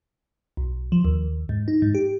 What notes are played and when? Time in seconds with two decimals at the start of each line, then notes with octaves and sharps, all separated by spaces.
0.57 B1
0.92 F3
1.05 D#2
1.49 G#2
1.68 D#4
1.82 G#2
1.95 G4